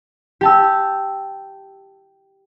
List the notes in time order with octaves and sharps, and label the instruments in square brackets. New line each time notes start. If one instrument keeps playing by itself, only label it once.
[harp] G4 A5 E6